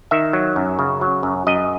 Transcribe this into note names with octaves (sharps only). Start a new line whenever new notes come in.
D#3 E5
F#3
F#2
C#3
F#3
F#2
F#2 D#5